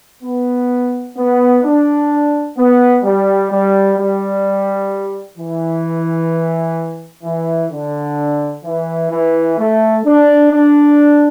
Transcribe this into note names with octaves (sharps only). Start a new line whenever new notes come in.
B3
B3
D4
B3
G3
G3
G3
E3
E3
D3
E3
E3
A3
D4
D4